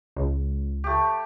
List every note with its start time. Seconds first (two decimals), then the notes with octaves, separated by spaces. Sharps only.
0.17 C#2
0.84 A3 G4